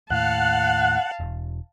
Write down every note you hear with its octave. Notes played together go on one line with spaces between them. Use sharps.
D#2 A2 F5 F#5 A5
E1